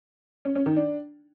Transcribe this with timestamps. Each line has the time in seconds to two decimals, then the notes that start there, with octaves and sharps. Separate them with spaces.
0.45 C#4
0.55 C#4
0.66 D#3
0.76 D4